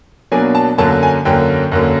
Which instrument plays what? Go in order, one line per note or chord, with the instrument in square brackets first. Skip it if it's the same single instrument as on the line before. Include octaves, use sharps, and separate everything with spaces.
[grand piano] B2 F#3 A#3 D4 G#5
A5
F#2 D3 F#3 A#3 A5
G#5
F#2 D3 F#3 A#3 G5
F#2 D3 F#3 A#3